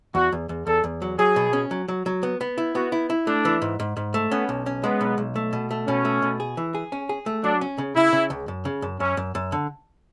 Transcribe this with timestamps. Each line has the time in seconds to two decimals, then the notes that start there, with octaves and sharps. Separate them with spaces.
0.15 E2 F#4
0.32 E2
0.49 E2
0.67 E2 A4
0.84 E2
1.02 F#3
1.19 F#3 G#4
1.36 B2
1.53 C#4
1.71 F#3
1.88 F#3
2.06 F#3
2.23 B3
2.41 B3
2.58 E4
2.75 B3 F#4
2.92 E4
3.10 E4
3.27 A3 D4
3.45 E3
3.62 G#2
3.80 G#2
3.97 G#2
4.14 A3
4.31 B3 C#4
4.49 B1
4.66 C#4
4.84 G#3 B3
5.01 B1
5.18 B1
5.36 A3
5.53 B2
5.71 A3
5.87 B2 C#4
6.05 A3
6.22 B2
6.40 G#4
6.57 E3
6.75 G#4
6.92 C#4
7.09 G#4
7.26 A3
7.44 F#3 D4
7.61 C#4
7.78 C#3
7.96 C#3 E4
8.13 C#3
8.30 C#2
8.48 F#2
8.65 C#3
8.82 F#2
9.00 F#2 C#4
9.17 F#2
9.35 F#2
9.52 D3